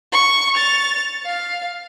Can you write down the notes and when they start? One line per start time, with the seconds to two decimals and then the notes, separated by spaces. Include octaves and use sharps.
0.12 C#6
0.55 A6 F7
1.25 F5